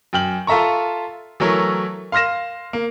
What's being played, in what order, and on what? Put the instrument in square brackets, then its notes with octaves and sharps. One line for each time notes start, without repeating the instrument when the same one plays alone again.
[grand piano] F#2 G5 F6 F#7
F4 A4 E5 A#5 C#6
E3 F#3 A3 A#4 C#5
F5 C6 F6 A#6 E7
A#3